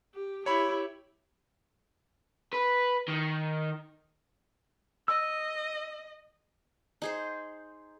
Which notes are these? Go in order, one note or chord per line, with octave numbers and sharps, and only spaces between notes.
G4
E4 G4 C#5 B5
B4
D#3
D#5 E6
D#4 G#4 C5